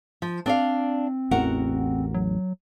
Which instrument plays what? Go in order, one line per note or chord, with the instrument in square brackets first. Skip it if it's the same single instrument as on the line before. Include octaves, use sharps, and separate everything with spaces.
[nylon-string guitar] F3
[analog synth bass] C4 [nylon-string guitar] D4 D5 F5
[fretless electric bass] A1 E2 [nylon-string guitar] F#4 A#4 F#5
[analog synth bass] F#3